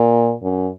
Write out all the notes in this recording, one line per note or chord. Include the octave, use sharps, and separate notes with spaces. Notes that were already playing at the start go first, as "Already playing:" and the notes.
Already playing: A#2
F#2